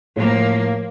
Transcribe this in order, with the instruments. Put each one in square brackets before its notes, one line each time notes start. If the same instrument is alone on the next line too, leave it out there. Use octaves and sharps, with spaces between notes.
[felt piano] A2 [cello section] F3 A#3